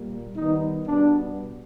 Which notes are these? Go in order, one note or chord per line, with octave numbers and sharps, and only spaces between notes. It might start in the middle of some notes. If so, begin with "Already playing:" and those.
Already playing: A#2 G3 A#3
D#3 G3 B3 D#4
B2 G3 B3 D4